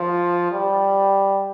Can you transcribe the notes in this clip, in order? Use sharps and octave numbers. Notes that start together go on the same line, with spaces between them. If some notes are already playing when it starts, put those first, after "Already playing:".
Already playing: F3
G3